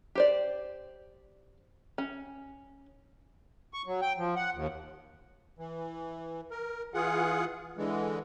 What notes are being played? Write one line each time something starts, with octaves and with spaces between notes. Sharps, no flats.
G4 C5 D5
C#4
C#6
F#3
G5
F3
F#5
D#2
E3
A#4
E3 F4 G#4 F#5
D3 E3 G#3